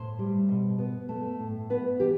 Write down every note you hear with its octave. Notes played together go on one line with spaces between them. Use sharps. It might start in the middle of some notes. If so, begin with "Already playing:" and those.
Already playing: A2 C5
G3
B2
B3
A3
A2
B3 B4
E3 G4